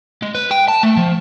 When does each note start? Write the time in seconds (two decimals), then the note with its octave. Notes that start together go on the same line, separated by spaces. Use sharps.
0.23 G#3
0.35 B4
0.51 G5
0.68 A5
0.83 A3
0.97 F3